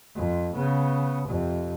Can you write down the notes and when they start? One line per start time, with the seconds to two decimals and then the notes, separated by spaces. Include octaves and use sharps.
0.15 F2
0.54 C#3 B3
1.28 F2 C3